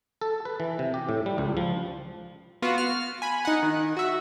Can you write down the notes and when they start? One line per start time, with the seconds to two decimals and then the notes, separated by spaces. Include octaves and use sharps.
0.21 A4
0.45 B4
0.60 E3
0.79 C3
0.94 G4
1.09 A2
1.26 G3
1.38 C#2
1.57 F3
2.62 B3 F4 F#4
2.78 F6
3.22 G#5 B5
3.45 D#4 F#5
3.63 D#3
3.97 F#4 E5